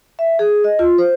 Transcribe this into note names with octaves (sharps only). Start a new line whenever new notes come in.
E5
G#4
D#5
F4
C5